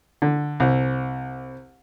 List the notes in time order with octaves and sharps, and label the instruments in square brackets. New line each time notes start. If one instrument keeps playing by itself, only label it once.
[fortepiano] D3
C2